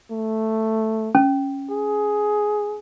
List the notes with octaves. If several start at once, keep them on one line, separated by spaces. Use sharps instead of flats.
A3
C#4
G#4